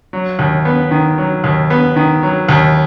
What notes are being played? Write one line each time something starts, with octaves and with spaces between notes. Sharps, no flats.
F#3
D#2
B3
D#3
F#3
D#2
B3
D#3
F#3
D#2